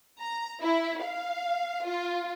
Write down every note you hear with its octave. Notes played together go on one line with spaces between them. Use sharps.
A#5
E4
F5
F4